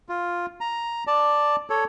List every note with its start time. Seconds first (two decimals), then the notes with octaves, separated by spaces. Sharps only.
0.09 F4
0.61 A#5
1.07 D5 A5
1.70 A4 C#5